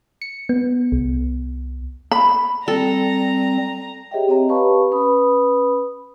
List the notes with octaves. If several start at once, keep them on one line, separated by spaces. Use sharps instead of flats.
C#7
B3
C2
B5
G3 C4 A4 A#5
G4 G#4 C#5 D#5 E5 G5
C4 C#5 D#5 A#5
G4 B4 F5 A5 B5 C#6
C#4 B4 B5 D#6